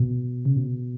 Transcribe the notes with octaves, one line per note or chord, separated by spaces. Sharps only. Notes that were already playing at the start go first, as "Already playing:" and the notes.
Already playing: B2
C#3
B2